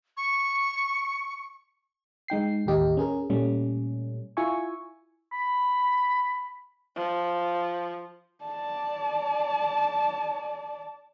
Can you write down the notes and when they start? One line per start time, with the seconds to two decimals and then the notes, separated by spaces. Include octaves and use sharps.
0.17 C#6
2.28 G#3 D#4 G5 C7
2.66 A1 D#2 G4 D#5
2.97 C#4 G#4 A#4
3.30 A#2 G3 A3 C#4
4.37 E4 F4 E5 G#5 C#6
5.32 B5
6.96 F3
8.44 D5 A5